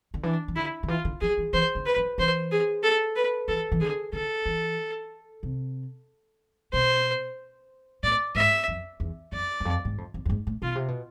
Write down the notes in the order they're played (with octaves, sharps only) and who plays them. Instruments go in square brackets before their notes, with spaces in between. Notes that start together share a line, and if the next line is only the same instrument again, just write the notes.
[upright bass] D3
[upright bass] E3 [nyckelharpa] D4
[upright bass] E3
[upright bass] D3 [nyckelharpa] E4
[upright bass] D3
[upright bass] E3 [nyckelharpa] F4
[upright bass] D3
[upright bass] F3 [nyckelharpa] G#4
[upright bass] E3
[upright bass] E3 [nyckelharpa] C5
[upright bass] D3
[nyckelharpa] B4
[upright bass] F3
[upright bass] E3 [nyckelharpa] C5
[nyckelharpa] G#4
A4
B4
[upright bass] E3 [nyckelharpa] A4
[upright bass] E3
[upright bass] D3 [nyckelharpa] G#4
[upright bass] D3 [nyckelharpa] A4
[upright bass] E3
C3
[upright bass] B2 [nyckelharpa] C5
[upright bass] A2 [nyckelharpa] D5
[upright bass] G#2 [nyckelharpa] E5
[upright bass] F2
E2
[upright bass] F2 [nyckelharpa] D5
[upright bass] E2
F2
G#2
F2
F2
F2
G#2
A2
[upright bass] B2 [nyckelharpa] F4
[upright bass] C3
B2